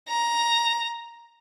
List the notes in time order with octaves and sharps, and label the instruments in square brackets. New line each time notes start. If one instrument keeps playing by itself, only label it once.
[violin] A#5